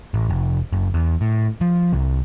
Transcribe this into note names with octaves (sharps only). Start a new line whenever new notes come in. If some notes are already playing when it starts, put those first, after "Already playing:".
A1
F1
F#1
E2
A2
F3
C2